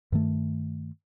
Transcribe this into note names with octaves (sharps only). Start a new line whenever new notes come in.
G2 D#3 A3